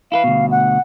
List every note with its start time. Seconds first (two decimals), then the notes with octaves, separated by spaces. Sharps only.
0.12 E4 A4 B4 F5
0.24 D2 B2
0.51 F#5